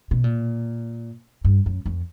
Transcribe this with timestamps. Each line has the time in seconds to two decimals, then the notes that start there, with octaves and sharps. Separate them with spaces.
0.11 B2
0.24 A#2
1.45 G2
1.66 F#2
1.86 F2